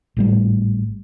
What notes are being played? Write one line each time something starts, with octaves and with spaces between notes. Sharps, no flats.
G#1 A2 G3